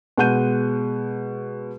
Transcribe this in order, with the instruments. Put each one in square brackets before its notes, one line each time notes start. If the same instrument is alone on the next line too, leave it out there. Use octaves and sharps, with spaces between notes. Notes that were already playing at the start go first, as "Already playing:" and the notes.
[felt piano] B2 G#3 F#5 G6 D#7